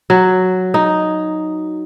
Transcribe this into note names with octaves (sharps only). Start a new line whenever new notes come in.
F#3
D#4